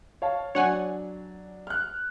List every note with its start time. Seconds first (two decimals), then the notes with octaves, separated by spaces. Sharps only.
0.22 C#5 F5 A5
0.55 F#3 D4 C#5 F#5 G#5
1.67 F6 F#6